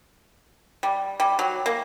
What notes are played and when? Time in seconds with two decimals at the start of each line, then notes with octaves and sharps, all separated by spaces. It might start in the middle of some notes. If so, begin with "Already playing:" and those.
0.83 G3
1.20 G3
1.39 F#3
1.66 A#3